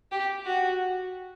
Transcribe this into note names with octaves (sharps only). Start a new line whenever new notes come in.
G4
F#4